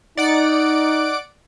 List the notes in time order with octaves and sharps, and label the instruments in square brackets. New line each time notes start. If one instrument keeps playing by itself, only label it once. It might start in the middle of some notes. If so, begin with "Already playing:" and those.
[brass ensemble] D#4 [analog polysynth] D5 F#5 D7